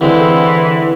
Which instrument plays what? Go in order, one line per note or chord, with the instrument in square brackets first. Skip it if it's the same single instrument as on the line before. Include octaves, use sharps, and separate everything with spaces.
[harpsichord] D3 G#3 C4 [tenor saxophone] E3